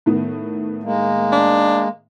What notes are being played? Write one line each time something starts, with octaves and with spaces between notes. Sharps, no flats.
A2 D#3 B3
G#3 A#3
D4